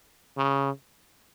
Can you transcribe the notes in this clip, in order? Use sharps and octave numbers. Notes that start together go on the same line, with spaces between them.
C#3